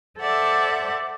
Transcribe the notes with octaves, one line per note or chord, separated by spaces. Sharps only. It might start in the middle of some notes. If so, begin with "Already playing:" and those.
A4 C5 D5 E5 F#5